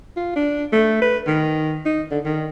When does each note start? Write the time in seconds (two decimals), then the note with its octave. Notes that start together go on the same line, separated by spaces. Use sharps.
0.16 F4
0.36 D4
0.72 A3
1.01 B4
1.27 D#3
1.85 D#4
2.11 D3
2.25 D#3